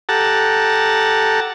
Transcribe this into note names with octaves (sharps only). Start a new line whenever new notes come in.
G4 A4 F#5 A5 A#5